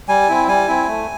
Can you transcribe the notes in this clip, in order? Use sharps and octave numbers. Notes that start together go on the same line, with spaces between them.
G3 G#5
C4 E4
G3 G#5
C4 E4
A3